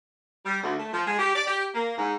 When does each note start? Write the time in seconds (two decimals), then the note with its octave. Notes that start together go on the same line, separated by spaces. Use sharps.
0.45 G3
0.63 D2
0.79 A3
0.93 F3
1.06 G#3
1.19 G4
1.34 D5
1.47 G4
1.75 A#3
1.98 G#2